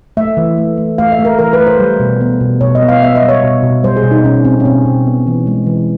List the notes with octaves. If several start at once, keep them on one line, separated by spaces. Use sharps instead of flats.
A3 E5
E3
A3
A3
A3 F5
E5
A3
A#4
E3 A#4
B4
A3
C5
G3
B2
B3
B2
B2 C#5
D#5
B3
F5
B3 E5
D#5
G3
C#5
B2
B2
G3 C5
G#4
B2
D#4
B2 C#4
B2 C4
C#4
B2 C4
B2
B3
E3
G#3
E3